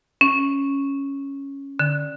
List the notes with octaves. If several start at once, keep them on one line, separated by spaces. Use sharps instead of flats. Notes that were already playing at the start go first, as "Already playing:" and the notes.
C#4
D3